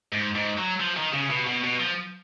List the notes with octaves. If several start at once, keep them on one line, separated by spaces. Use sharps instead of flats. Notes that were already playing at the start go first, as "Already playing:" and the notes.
G#2
G#2
F#3
F3
D#3
C#3
B2
B2
B2
F3